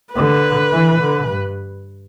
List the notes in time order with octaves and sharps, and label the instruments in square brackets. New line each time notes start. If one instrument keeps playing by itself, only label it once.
[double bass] D3 [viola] B4
[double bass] E3
D3
G2